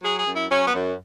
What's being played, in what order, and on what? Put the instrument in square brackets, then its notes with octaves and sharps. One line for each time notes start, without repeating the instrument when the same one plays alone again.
[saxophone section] F#3 G#4
G#4
F#2
E4
F#3 C#4
B3
F#2